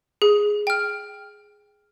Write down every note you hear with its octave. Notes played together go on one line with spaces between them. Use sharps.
G#4
G5 F6